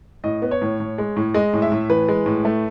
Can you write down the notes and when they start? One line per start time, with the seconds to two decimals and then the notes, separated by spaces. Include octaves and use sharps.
0.24 A2 D#5
0.42 B3
0.51 C#5
0.62 A2
0.80 A2
0.98 G#3
1.17 A2
1.34 G#3 D#5
1.53 A2
1.62 E5
1.72 A2
1.90 E3 B4
2.08 G#3
2.26 A2
2.45 A3